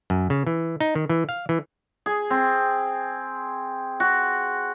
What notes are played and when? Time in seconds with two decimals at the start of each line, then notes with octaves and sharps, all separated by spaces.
0.10 F#2
0.30 C#3
0.47 E3
0.80 D#4
0.95 D#3
1.09 E3
1.29 F5
1.49 E3
2.06 G#4
2.30 C4
4.00 F#4